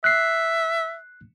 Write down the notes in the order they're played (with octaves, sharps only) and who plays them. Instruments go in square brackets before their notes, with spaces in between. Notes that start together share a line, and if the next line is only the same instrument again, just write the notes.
[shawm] E5 [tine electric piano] F#6 C7